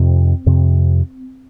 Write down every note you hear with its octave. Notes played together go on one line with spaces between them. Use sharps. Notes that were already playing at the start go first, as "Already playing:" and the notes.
Already playing: F2 C3 C4
F2 C3